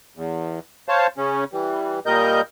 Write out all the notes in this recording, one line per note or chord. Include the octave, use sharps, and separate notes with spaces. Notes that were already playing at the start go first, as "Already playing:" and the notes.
E2
C5 C#5 F5 A5
C#3 C#4
E3 G3
A#2 G3 A#4 D#5 G6